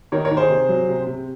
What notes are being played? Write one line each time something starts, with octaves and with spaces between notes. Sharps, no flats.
D#3 A#4 C#5
A#4 C#5
D#3
G#4 C5
C3
F#3
C3
C3